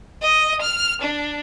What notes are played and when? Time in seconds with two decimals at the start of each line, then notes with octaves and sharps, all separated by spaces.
0.22 D#5
0.61 F6
1.01 D4